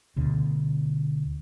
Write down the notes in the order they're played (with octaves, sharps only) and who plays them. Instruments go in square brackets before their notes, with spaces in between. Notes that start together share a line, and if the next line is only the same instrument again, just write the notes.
[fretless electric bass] D2 B2 D3